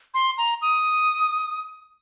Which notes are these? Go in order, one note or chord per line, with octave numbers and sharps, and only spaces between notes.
C6
A#5
D#6